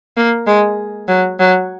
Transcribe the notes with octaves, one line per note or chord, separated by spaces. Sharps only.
A#3
G#3
F#3
F#3